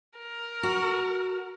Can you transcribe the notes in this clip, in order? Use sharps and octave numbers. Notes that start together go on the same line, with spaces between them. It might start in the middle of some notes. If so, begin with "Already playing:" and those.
A#4
F#4